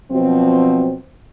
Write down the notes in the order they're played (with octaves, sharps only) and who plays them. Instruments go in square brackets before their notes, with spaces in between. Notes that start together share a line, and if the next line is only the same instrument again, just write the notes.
[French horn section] B2 F3 F#3 C4